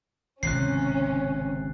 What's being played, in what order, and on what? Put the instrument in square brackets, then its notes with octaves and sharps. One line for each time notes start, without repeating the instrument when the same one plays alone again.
[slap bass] G#1 C#2 A2 [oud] C3 [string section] C#4 [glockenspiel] F#6 C7